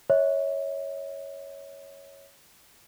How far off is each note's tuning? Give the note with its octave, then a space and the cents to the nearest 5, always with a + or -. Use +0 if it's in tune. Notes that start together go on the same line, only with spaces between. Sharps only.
C#5 +0 E5 -40